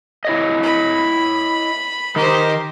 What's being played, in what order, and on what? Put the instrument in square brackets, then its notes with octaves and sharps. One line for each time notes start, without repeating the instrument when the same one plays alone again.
[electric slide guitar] E4 C#5 D#5
[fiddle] B5
[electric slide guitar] D#3 D#4 [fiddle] G4 C5